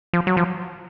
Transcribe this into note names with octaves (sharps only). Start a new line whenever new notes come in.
F3
F#3
F3